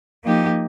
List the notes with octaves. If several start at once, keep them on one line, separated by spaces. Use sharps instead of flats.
F3 A#3 D#4 G4